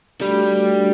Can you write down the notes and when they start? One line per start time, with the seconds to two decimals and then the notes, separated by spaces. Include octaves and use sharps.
0.21 G3 A3 D4 F#4 A4
0.77 A3 D4 F#4